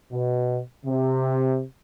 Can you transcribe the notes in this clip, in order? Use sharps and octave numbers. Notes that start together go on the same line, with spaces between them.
B2
C3